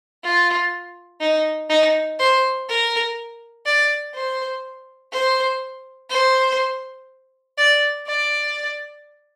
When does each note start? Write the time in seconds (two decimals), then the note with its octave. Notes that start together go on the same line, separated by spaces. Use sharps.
0.24 F4
1.21 D#4
1.70 D#4
2.19 C5
2.68 A#4
3.66 D5
4.15 C5
5.13 C5
6.10 C5
7.58 D5
8.07 D5